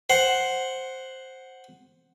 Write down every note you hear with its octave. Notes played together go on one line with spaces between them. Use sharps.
C5 F#5